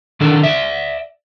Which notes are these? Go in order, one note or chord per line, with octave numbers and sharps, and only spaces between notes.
D#3 D4 A4 A#4
D5 E5